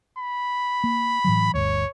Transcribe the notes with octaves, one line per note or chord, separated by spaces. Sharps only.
B5
A#3
A2 E3 F#3
G1 D2 C#5